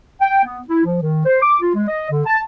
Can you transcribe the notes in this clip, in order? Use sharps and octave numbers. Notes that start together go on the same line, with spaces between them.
G5
B3
E4
F3
D#3
C5
D6
F4
G#3
D#5
D3
A5